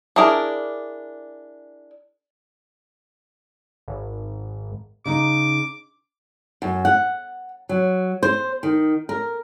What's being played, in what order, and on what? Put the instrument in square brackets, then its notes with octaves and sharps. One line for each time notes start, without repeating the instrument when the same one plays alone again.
[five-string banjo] D4 E4 G#4 A#4 D5
[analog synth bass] G#1
[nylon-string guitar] C#3 D#4 [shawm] D6
[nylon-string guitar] F#2
F#5
F#3
C5
D#3
A#4